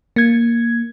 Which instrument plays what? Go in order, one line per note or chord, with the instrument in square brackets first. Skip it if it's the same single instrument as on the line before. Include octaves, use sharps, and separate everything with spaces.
[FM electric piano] A#3 G#6